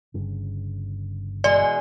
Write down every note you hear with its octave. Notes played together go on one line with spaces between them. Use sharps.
G1 G2 C#3
B2 E3 G#3 D5